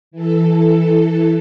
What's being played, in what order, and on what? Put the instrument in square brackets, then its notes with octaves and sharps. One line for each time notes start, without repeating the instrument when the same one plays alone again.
[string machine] E3 A4